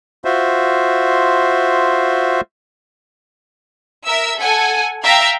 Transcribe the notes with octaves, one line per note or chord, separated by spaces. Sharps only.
F4 F#4 C5 E5
A#4 E5 E6
A4 F#5 G#5
E5 F5 G5 A#5